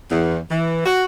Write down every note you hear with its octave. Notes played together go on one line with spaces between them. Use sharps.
E2
E3
F#4